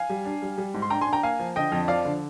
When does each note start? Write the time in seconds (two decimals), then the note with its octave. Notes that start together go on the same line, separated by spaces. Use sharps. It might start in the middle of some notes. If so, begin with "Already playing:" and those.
Already playing: F5 G#5
0.10 G3
0.25 D4
0.42 G3
0.58 G3
0.74 G#2
0.82 C6
0.90 D4 G5 A#5
1.01 G#5 C6
1.07 D4
1.13 G5 A#5
1.23 A#3 F5 G#5
1.40 F3
1.56 D3 D#5 G5
1.72 F2
1.88 F3 D5 F5
2.05 D3